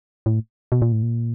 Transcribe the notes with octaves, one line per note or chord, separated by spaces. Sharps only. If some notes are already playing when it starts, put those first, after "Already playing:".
A2
B2
A#2
A2
A#2